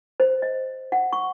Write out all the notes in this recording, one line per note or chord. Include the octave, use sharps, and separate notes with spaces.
C5
D#5
F#5
C#6